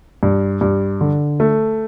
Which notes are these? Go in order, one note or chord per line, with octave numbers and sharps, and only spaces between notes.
G2
G2
D3
A3